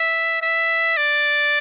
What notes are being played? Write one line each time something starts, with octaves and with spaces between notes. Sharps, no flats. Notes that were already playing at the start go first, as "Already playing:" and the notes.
Already playing: E5
E5
D5